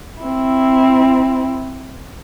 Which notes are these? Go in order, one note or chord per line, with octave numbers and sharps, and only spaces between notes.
C4 E4